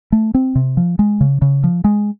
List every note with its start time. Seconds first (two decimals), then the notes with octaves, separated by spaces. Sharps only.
0.12 A3
0.34 C4
0.55 C3
0.77 F3
0.99 G#3
1.21 C#3
1.42 C#3
1.64 F3
1.84 G#3